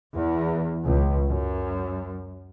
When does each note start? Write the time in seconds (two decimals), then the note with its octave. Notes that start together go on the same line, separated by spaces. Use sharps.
0.13 E2
0.85 C#2
1.28 F#2